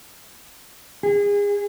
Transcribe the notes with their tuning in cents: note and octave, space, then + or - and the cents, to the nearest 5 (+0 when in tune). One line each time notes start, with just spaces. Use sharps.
G#4 -30